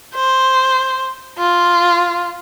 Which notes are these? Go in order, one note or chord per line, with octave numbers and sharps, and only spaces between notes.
C5
F4